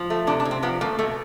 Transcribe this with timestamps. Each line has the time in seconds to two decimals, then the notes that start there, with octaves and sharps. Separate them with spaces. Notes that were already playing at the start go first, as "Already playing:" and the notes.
Already playing: F3
0.10 A3
0.27 C3 D4
0.40 D4
0.45 C3
0.51 C4
0.63 F3 B3
0.81 A3 A#3
0.99 B2 A3